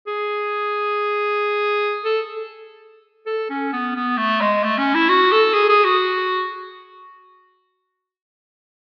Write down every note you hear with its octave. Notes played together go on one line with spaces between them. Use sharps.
G#4
A4
A4
C#4
B3
B3
A3
G#3
A3
C#4
E4
F#4
A4
G#4
G#4
F#4